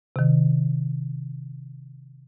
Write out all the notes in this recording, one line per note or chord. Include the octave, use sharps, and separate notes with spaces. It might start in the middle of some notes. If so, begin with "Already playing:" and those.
C3 D#3